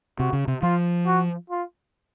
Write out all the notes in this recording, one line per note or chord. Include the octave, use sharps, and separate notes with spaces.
C3 F#4
C#3
C3
F3 F4
F#4
F4